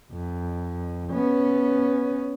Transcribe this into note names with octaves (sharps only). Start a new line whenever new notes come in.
F2
B3 C#4